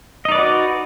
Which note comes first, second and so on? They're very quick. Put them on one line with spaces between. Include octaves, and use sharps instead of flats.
D#5 D#4 D5 B4 F#4